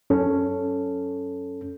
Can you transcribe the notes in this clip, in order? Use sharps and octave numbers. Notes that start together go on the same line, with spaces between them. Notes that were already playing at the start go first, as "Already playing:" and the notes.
F#2 C#4 A4